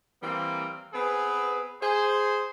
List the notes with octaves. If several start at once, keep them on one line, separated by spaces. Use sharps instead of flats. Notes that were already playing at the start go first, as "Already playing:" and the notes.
E3 G3 A#3 C4
B3 C4 G#4 B4
G#4 C5